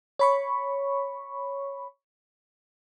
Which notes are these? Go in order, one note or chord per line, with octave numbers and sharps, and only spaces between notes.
C#5 B5 C#6